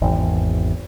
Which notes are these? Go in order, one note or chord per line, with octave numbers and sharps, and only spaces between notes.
G#1 E2